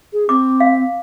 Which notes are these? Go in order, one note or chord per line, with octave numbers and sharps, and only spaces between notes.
G#4
C4 D6
F5